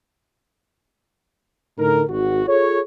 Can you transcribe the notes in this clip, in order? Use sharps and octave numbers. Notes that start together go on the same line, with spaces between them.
A2 D3 D#4 A4 A#4
G#1 F#4
F4 G#4 A4 C#5